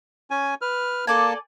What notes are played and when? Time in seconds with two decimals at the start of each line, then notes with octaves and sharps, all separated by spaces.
0.31 C#4 G#5
0.62 B4 F6
1.07 A#3 A4 D5 G#5 A5